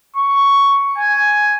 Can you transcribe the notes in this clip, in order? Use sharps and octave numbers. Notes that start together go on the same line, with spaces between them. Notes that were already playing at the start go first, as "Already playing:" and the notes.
C#6
G#5